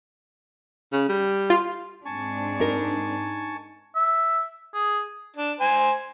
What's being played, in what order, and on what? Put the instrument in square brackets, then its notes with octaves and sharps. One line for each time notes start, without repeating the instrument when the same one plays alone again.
[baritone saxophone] C#3
G3
[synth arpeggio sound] F4
[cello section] G#2 C4 D4 [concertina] G#5 A5 C#6
[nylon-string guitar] D#4 A#4
[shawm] E5
G#4
[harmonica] D4
C5 G#5